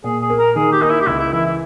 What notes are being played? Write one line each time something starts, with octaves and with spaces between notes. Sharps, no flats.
A#2 G#4
G#4
A#3
A#4
D#3 G#4
G4
A#3 D#4
E4
G4
C#2 E4
E4
E3 E4
E4